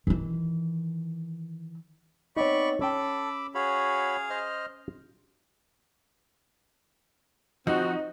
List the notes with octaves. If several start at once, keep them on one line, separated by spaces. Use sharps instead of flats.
D#3 E3
B3 C4 D#4 C#5 D5 B5 C#6
C#4 A4 G5 B5 D6 E6
F#4 G#4 C#5 F5 B5
C5 D#5 F6
F3 C4 D#4 F#4